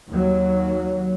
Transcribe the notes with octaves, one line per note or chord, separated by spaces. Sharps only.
D#2 F#3